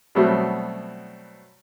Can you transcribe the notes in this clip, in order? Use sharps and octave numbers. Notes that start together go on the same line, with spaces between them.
B2 F#3 G3 A3 B3 C4